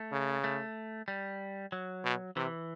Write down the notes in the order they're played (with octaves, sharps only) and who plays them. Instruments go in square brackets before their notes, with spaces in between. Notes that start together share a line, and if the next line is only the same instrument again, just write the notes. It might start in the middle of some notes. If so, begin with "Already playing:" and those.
Already playing: [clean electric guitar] A3
[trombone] C#3
[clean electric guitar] A3
G3
F#3
[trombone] B2
[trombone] C3 [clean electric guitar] E3